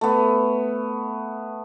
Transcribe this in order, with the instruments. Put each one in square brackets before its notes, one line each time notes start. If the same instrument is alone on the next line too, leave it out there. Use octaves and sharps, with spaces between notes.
[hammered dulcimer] A3 B3